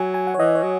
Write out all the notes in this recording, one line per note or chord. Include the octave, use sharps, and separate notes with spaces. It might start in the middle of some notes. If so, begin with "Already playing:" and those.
Already playing: F#3 G#5
G#5
F#5
C#5
E3 D#5
C#5
F#3